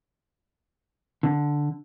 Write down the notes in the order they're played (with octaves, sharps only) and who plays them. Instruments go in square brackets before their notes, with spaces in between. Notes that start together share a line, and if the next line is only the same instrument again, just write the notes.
[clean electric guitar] D3